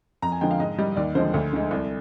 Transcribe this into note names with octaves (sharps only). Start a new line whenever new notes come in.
F2 A#5
G#5
D3 F3 G#3 G5
F5
G#2 D#5
G3 D#5
D#2 D5
D3 F3 G#3 C5
D2
D3 G#3
C2